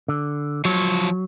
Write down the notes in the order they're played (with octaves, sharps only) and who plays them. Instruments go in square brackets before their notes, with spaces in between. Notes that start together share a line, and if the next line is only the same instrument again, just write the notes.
[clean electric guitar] D3
[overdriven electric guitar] F3 C#5 [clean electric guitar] F#3